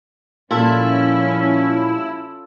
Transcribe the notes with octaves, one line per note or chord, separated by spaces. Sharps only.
A#2 F3 G3 C#4 E4 F4 A4